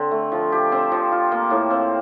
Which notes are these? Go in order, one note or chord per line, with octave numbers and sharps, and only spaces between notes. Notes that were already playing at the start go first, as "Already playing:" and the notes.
Already playing: D3 C4
A3
F3
G4
C4
F3
F4
A#3
A2
C4